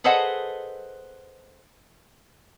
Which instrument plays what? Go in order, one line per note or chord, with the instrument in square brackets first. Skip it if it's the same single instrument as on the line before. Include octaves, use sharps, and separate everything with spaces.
[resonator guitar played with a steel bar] G#4 A4 B4 C5 D#5 F#5